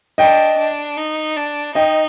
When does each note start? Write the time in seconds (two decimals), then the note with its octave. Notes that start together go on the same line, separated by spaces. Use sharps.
0.18 D4 D#5 G5
0.58 D4
0.97 D#4
1.37 D4
1.75 D#4 D#5 G5